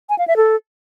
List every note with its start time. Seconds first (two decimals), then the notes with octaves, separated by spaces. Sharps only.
0.09 G#5
0.18 F5
0.28 E5
0.37 A4